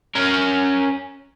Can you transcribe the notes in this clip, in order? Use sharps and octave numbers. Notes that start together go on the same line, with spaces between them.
C#4 A#4